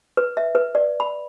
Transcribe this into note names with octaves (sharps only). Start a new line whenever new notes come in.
B4
E5
B4
D5
B5